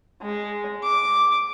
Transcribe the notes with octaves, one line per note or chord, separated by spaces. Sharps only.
G#3
D6